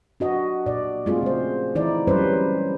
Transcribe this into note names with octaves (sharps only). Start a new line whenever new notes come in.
D4 F#4 D#5
A#2 D5
G#3 A3 C4 F4 G#4
C#3 C5
D3 E3 D#4 E4 D5
F#3 G3 C#4 B4 C5